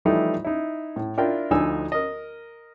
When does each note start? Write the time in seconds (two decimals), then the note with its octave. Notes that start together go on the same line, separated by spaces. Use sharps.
0.05 E3 F3 G3 A3 D#4 E4
0.44 D#4 E4
0.96 A2
1.18 D4 E4 F4 A#4 G5
1.51 D2 D3 F3 D#4 G#5 E6
1.92 A#4 D#5